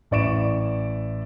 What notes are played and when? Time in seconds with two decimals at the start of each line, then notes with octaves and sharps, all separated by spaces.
0.11 A1 E4 D5 C#6 D7 E7